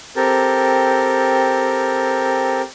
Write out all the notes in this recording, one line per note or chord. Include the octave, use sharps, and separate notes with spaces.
C4 G4 A4 A#4